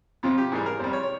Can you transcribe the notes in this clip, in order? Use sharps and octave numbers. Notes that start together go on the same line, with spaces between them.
F2 C3 F3 F4
G4
G#2 E3 G3 G#4
A#4
F2 C3 G3 C5
C#5
C#5